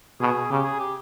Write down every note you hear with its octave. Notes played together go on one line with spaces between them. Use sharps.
B2 G#4
C#3 G4
G#4
G4